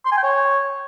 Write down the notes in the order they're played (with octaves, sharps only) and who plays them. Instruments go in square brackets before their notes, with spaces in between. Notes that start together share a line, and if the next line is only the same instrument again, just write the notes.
[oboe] C6
G#5
G5
C#5